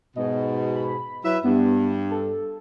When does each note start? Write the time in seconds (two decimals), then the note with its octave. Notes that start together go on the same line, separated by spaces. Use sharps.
0.16 G#2 B2 D#5
0.76 B5
1.24 F#3 E4 B4 E5
1.44 G2 B3
2.11 A4